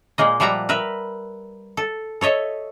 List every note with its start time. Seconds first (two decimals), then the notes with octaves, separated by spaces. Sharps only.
0.18 A#2 G#3 A#3 D#5
0.40 F3 G3 E5 F#5 A#5
0.69 A#4 B4 E5
1.77 A4
2.21 A4 C#5 D#5 E5